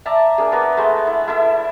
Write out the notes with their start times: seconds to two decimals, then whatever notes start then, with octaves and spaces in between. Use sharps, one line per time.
0.06 D5 E5 A5 A#5
0.38 A#3 D4 G#4
0.52 B3 A#4
0.77 G#3 A3
1.07 E4
1.27 E4 A4 E5